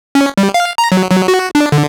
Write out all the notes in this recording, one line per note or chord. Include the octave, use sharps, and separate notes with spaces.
C#4
G3
F5
A#5
F#3
F#3
F#4
D4
D3